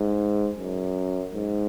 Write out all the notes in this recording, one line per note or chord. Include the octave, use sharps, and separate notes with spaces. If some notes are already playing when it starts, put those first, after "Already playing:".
Already playing: G#2
F#2
G#2